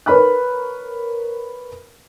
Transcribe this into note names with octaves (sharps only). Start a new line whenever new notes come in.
A#4 B4 C#5 B5 F6 F#6